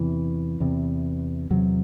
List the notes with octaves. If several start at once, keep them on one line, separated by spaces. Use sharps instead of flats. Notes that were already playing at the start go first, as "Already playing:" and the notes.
Already playing: E2 C3 E3
E2 C3
E2 C3 F#3